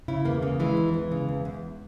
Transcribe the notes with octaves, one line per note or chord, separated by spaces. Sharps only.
C#3 E4
E2 A#3
C#3 A#3
E3 G#3
E2
E3
C#3
E2
E2